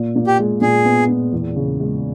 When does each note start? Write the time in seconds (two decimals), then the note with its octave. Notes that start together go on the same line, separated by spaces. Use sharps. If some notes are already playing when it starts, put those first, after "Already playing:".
Already playing: A#2
0.16 A#2
0.27 G4
0.39 G#3
0.62 A#2 G#4
0.85 B3
1.09 A#2
1.33 E2
1.56 C#3
1.80 G#3